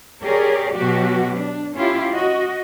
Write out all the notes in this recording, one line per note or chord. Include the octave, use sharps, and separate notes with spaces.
G4 G#4 A#4 C#5 D5
B2 F#3 F#4 G4
D4
C#4 E4 F4 G4
F#4 D#5